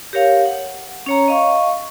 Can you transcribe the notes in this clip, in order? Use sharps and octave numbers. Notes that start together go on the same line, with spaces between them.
G4 A#4 C#5 F5
F#5
C#4 C#5 A#5
D#5 F5 C#6